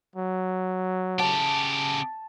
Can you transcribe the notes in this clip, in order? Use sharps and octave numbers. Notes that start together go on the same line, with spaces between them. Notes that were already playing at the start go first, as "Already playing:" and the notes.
F#3
C#3 G4 A5